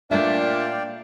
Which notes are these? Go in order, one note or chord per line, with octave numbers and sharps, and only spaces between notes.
A#2 A3 D4 C#5 D5 E5 F5 G5